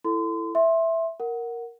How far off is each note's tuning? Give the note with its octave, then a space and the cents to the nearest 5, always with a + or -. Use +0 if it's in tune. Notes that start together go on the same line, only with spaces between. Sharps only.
E4 +15 A4 +10 C6 -35
E5 +0 C6 +20
A#4 +0 F#5 +0